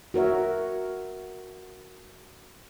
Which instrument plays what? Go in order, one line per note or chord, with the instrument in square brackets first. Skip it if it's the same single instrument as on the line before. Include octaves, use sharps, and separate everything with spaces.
[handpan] F#4 A#4 C#5 E5